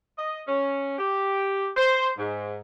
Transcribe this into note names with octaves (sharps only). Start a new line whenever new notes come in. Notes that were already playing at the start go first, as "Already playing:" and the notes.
D#5
C#4
G4
C5
G#2